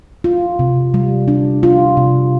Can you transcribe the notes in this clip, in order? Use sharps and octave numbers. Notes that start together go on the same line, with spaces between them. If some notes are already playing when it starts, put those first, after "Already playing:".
F4
C3
G3
D4
F4
C3